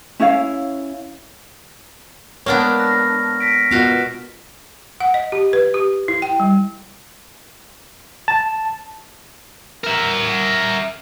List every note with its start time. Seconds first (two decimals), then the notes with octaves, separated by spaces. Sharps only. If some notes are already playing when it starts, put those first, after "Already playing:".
0.20 C#4 E4 C#5 F5
2.46 G#3 A#3 B3 D4 C#5 C#6 F6
2.80 F6 A#6
3.40 A#6 B6 D7
3.71 B2 B3 F4 F#4 A#4 F5
5.01 F#5
5.14 D#5
5.32 G4
5.53 B4
5.74 G4
6.08 E4
6.22 G5
6.40 G3
8.28 A5
9.84 A#4 E5